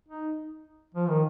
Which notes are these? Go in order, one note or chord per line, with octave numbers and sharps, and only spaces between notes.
D#4
F3
D#3